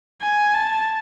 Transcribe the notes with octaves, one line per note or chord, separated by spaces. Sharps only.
G#5
A5